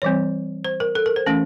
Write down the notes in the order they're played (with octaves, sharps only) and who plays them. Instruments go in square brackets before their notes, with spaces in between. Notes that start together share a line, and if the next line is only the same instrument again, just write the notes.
[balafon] E3 G3 C4 C#5
C5
A#4
A4
A#4
C5
E3 A3 C#4